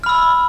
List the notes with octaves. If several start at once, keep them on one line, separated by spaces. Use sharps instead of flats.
B5 E6 F6